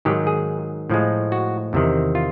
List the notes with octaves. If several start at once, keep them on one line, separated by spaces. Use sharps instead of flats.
G#2 D#3 F#3 G4
G#4
A2 F3 G#3
F#4
E2 C3 D#3
F4